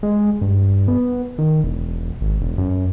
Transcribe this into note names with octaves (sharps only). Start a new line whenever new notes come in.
G#3
G2
B3
D#3
E1
G#1
E1
F#2